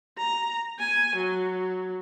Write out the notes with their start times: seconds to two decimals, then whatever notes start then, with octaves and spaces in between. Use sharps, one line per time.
0.18 A#5
0.79 G#5
1.16 F#3